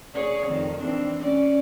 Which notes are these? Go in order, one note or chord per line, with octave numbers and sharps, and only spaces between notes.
G#4 C#5 D5
F2 D#3
E3 C4 D4
C#4 D5